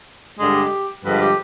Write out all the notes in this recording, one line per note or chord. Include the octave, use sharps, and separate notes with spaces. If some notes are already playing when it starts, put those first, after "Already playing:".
G2 D3 G#3 G4
G2 D3 F3 G#3 B4
G4